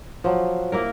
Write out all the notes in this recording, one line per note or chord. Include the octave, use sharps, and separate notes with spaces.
F3 F#3
A#3 E4 A#4